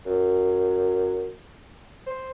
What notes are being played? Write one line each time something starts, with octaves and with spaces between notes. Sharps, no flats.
F#2
C5